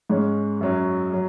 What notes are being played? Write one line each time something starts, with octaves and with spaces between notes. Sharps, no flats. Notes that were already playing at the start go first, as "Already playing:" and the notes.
G#2 G#3 C#4
F#2 F#3 C#4
F#3